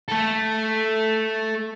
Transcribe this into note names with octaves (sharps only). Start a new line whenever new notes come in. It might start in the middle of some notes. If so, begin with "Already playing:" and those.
A3 A4